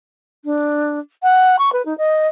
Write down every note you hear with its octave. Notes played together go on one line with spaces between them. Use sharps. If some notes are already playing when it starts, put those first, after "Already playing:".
D4
F#5
C#6
B4
D#4
D#5